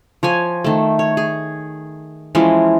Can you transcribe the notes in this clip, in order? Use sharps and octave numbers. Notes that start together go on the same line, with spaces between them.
F3 C#5 G#5
D#3 A3
C#5
G#4
E3 F3 G#3 C#4